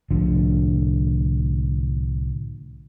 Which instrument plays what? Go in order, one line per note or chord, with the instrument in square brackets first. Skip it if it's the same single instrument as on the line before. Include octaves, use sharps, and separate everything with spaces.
[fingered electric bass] C2 A2 D3 F3